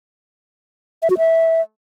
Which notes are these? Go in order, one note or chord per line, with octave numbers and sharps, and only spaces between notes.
E5
F#4
E5